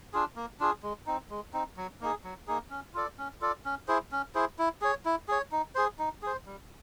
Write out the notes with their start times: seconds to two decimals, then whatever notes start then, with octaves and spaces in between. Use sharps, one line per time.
0.13 D4 F4 G#4
0.36 A#3
0.60 D4 F4 G#4
0.83 G#3
1.07 C4 D#4
1.30 G#3
1.53 C4 D#4
1.77 F#3
2.01 A#3 D#4 G#4
2.24 F#3
2.48 A#3 D#4 G#4
2.70 C#4
2.94 F4 A4 D5
3.18 C#4
3.41 F4 A4 D5
3.65 C#4
3.88 E4 G#4 C5
4.12 C#4
4.35 E4 G#4 C5
4.59 E4
4.82 G#4 C#5
5.05 E4
5.28 G#4 C#5
5.52 D#4
5.75 G#4 C5
5.99 D#4
6.22 G#4 C5
6.46 G3